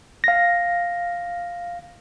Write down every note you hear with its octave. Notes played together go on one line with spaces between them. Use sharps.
F5 A#6